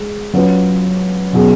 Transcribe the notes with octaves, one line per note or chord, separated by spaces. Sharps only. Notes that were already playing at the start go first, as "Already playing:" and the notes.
Already playing: G#3
F#3 C#4 F4 B4
B2 F#3 C#4 G#4